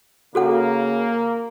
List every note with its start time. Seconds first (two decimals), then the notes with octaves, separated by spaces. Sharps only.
0.35 C#3 A#3 F#4 A4 F#5